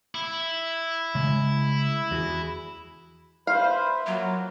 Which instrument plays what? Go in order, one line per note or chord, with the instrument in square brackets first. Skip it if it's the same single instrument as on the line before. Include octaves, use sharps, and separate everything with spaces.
[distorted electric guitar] E4
[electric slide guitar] C#3 G#3
E2 F#4 G#4
[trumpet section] B4 C5 [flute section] E5 B5 [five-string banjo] F5
[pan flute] F#3 [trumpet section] A#3 F4 F#4